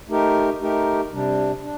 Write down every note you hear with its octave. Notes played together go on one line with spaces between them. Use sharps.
A3 D#4 G4 A#4
A3 D#4 G4 A#4
C3 G3 D4
D4